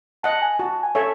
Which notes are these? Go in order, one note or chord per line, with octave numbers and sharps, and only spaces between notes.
D#5 F#5 A5
G#5
F#4 A5
G#5
A4 C#5 E5